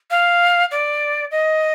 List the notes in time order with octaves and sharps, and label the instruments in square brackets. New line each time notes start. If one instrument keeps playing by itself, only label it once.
[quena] F5
D5
D#5